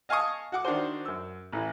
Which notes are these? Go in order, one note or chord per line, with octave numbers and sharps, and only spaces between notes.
D#5 F5 G#5 A5 C#6 D#6
F#4 F#5 D6
D#3 D4 F#4 C5
F#2 E6
A1 E3